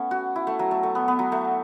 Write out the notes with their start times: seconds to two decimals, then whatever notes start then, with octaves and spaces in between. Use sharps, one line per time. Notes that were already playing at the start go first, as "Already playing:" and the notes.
Already playing: A3 B3 C#4
0.11 F#4
0.36 E4
0.47 A3
0.59 F#3
0.71 A3
0.83 A3
0.95 B3
1.08 B3
1.19 F#3
1.32 A3